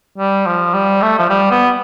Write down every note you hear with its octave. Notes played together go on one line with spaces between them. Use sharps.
G3
F3
G3
A3
F3
G3
B3